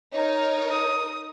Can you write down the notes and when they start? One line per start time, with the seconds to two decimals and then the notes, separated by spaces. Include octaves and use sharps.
0.13 D#4 A#4 C#5
0.70 D#6